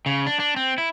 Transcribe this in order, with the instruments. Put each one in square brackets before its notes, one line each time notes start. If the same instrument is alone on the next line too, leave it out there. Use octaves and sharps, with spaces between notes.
[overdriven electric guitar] C#3
D4
D4
C4
E4